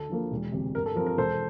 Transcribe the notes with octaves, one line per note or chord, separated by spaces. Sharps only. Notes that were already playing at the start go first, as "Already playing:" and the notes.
Already playing: D2 A4
D3 F3 A#3
E1
D2 C3
G2 A#4
A4
F3 C4 A#4
A#4
E1 A4 C5